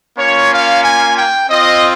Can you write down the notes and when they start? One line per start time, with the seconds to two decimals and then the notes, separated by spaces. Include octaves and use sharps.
0.17 A#3 C#4 F4 C#5
0.51 F5
0.84 G#5
1.16 G5
1.49 C4 F4 D#5